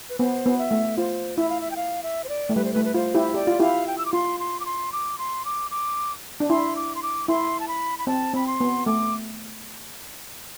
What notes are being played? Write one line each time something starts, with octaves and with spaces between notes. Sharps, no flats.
B4
B3 C5
B3
E5
A3
F4 C5
E4 E5
F5
E5
G5
F5
E5
C5
D5
A3
G3 B4
C5
A3 B4
B4
F4 C5
E4 G4
G4 D5
F4
E4 G4 F5
G5
E6
D6
F4 C6
C6
D6
C6
D6
C6
D6
D6
D4
E4 C6
D6
C6
D6
E4 C6
A5
B5
B5
C4 A5
C4 B5
C6
B3
A3 D6